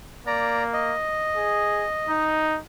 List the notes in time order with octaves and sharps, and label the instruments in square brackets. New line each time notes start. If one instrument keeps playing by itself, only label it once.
[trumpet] A#3 [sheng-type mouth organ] D5 A#5
[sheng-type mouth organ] D#5
[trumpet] G#4
D#4